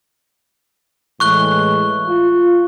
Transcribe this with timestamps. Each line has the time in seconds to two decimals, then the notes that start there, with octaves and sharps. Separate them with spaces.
1.20 A2 E3 G#3 C#6 F#6 G7
2.06 F4